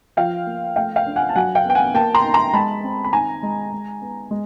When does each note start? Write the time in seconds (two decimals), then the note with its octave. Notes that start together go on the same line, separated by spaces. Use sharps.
0.17 F3 F5 G5
0.46 A#3
0.76 A3 F5 G5
0.96 F5 G5
1.06 D4
1.16 F#5 G#5
1.29 A5
1.35 F#3 F#5 G#5
1.55 F5 G5
1.65 B3 G5
1.75 F#5 G#5
1.94 A#3 G5 A5
2.15 A#5 C6
2.24 D#4
2.34 A#5 C6
2.54 G#3 A5 B5
2.84 C4
3.05 B5
3.13 D#3 G#5 A#5
3.43 G#3
3.72 G#3
4.02 B3
4.31 G#3